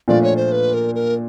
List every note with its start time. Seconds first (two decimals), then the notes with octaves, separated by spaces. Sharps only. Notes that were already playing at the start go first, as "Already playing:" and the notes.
0.08 A#2 F3 A3 D4 F4 D5
0.23 C#5
0.37 C5
0.52 B4
0.74 A#4
0.95 A#4